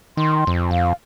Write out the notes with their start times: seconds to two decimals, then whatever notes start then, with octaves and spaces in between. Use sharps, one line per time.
0.17 D#3 C6
0.47 F2
0.71 F2 F5